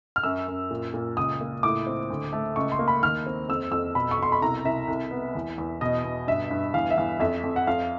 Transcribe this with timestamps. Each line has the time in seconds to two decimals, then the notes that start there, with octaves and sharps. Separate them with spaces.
0.16 F6
0.23 F#2 E6
0.48 F#2
0.70 A#2
0.94 A#2
1.17 C#2 D#6
1.41 A#3
1.63 A2 D6
1.87 C4
2.10 D2
2.33 A3
2.56 C#2 C#6
2.72 C6
2.79 A#3
2.88 B5
3.02 D#2 F6
3.26 C4
3.49 F2 E6
3.72 F2 E6
3.95 B2 B5
4.11 C#6
4.19 B2 C6
4.32 B5
4.42 C2 A#5
4.65 C2 E5
4.88 C2
5.11 B3
5.35 E2
5.58 E2
5.81 B2 D#5
6.04 B2
6.27 G2 E5
6.51 G2
6.74 E2 F5
6.91 E5
6.98 E2 F5
7.20 F2 E5
7.44 F2
7.56 F#5
7.67 F2 F5